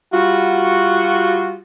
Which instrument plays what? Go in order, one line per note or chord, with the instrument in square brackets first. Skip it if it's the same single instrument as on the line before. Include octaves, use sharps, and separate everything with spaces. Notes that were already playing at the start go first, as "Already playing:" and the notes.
[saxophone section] G3 F4 F#4